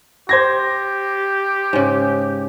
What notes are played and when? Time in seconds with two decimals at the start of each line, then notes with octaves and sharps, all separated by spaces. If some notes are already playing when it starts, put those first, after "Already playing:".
0.29 G4 C5 G#6 A#6
1.73 G#2 C#3